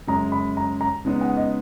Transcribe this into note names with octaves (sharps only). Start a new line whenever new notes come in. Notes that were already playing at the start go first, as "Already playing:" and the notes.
F#2 C#3 G#3 C#4 A#5
B5
A#5
A#5
C#3 G#3 B3 D#4
F#5
D#5